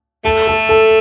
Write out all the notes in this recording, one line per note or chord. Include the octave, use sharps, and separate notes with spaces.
A3 A4
A4
A4